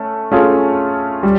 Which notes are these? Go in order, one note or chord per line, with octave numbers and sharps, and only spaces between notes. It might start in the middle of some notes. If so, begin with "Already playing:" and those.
Already playing: A3 C#4
A3 C#4 F4 G#4
G3